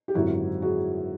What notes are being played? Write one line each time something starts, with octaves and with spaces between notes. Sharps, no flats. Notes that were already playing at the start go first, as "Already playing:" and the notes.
G4
G#1 F#2 D3 F#3 E4 F#4
F#4 G#4